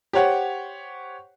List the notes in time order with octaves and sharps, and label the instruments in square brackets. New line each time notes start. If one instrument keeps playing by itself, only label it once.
[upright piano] G4 C5 C#5 F#5